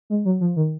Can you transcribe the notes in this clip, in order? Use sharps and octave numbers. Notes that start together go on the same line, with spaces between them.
G#3
F#3
F3
D#3